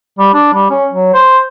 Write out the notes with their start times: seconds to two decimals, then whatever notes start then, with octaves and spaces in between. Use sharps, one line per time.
0.19 G3
0.34 D4
0.53 G3
0.70 C#4
0.92 F#3
1.13 C5